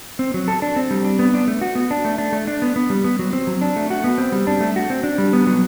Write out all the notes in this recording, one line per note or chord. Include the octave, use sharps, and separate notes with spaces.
C4
F#3
A4
D4
C4
G3
D4
B3
D4
A3
F#4
B3
D4
A3
D4
A3
D4
B3
B3
G3
B3
F#3
C4
F#3
D4
A3
F#4
B3
C4
G3
D4
A3
F#4
C4
D4
G3
B3
F#3